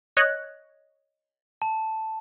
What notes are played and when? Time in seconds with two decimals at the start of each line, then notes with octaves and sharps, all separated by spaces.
0.17 C#5 D#5 F#6
1.62 A5